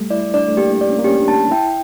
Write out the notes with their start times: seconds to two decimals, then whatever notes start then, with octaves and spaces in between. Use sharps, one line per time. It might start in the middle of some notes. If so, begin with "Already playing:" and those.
Already playing: G3 A3
0.10 E4 D5
0.34 D4 D5
0.48 A3
0.57 A#3 G4
0.81 D5
0.89 C#4
0.98 A#3
1.04 C#4 G4
1.20 D4
1.28 A5
1.51 E4 G5